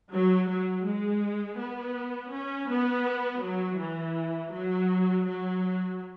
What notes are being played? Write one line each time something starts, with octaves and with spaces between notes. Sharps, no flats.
F#3
F#3
G#3
B3
C#4
B3
F#3
E3
F#3
F#3